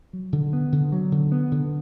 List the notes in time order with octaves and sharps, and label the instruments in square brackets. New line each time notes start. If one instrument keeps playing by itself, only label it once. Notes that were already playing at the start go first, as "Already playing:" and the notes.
[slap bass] F#3
D3
B3
D3
F#3
D3
B3
D3